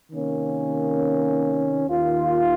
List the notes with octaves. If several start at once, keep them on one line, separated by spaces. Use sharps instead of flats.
C3 D#3 A#3 C#4
D#2 D#3 A#3 F4